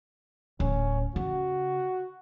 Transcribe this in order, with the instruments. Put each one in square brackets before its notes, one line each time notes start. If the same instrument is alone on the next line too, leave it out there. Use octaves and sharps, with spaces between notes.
[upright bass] D1 [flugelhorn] C#4
[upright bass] C#3 [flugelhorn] F#4